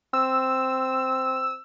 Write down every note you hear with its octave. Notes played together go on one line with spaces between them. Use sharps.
C4 E6